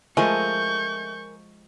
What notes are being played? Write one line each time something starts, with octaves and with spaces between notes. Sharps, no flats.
F3 G#3 A3 A#4 G#5 C#6 G6